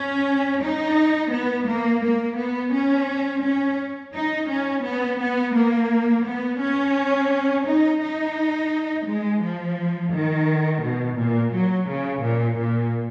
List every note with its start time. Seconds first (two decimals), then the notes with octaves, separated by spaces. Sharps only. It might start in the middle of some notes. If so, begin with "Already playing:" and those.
Already playing: C#4
0.61 D#4
1.31 B3
1.67 A#3
2.02 A#3
2.37 B3
2.73 C#4
3.43 C#4
4.13 D#4
4.49 C#4
4.83 B3
5.19 B3
5.54 A#3
6.25 B3
6.60 C#4
7.65 D#4
8.01 D#4
9.06 G#3
9.41 F3
10.11 D#3
10.81 B2
11.17 A#2
11.52 F#3
11.88 C#3
12.22 A#2
12.58 A#2